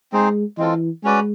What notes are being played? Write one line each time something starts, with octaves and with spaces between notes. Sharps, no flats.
G#3 C4 D#4 G#4 C5
E3 G#3 C4 F4 A4
G#3 C#4 F#4 B4 D5